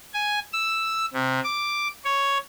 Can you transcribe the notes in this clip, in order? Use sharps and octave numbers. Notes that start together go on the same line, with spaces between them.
G#5
E6
C3
D6
C#5